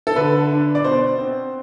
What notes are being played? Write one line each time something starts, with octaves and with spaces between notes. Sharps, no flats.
A4
D3 B4
D4
D5
B2 C5
C4